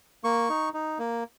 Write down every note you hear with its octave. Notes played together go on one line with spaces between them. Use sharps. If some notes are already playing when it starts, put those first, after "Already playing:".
A#3 C#6
D#4
D#4
A#3